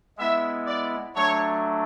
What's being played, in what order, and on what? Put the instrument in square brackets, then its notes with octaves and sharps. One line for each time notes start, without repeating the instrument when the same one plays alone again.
[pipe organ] G#3 B3 E4 [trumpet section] E5
[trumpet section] D5
[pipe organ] F#3 A3 D4 [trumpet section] C#5